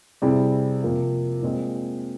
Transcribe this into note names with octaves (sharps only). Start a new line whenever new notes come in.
C3 G3 C4 E4 G#4
C3 F3 A#3
A#2 G#3 C4